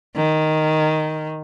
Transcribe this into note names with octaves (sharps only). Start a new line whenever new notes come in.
D#3